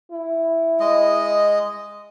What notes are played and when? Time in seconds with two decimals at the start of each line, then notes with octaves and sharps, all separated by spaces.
0.12 E4
0.80 G#3 D#5